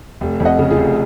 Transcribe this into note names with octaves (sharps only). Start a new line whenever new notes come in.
F1
F2
D#5 F#5
C#3
F4 G#4
F1